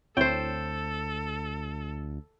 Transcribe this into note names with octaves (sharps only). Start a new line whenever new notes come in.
D2 C4 E4 A4 C5 C#5 G5